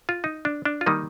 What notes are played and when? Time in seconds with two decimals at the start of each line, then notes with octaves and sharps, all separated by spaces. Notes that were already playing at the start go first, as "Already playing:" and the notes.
0.09 F4
0.24 D#4
0.45 D4
0.65 D4
0.81 F4
0.86 D#3 G3 A#3 D#4